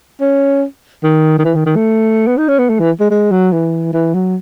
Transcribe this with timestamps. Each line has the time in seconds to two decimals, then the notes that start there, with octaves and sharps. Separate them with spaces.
0.21 C#4
1.03 D#3
1.39 D#3
1.45 E3
1.55 D#3
1.66 D#3
1.76 A3
2.27 B3
2.38 D#4
2.48 C#4
2.59 B3
2.69 A3
2.80 E3
3.00 G#3
3.11 G#3
3.31 F#3
3.52 E3
3.93 E3
4.14 F#3